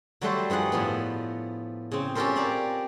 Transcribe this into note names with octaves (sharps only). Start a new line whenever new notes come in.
F#3 G3 A3 F#4 A4 C5
G2 F3 G#4 F#5
A2 F3 B3
C#3 C4
C#4 F4 G4 A4 A#4 C5
C4 D5 A#5